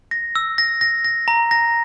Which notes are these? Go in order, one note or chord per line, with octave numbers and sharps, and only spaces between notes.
A#6
E6
A#6
A#6
A#6
A#5
A#6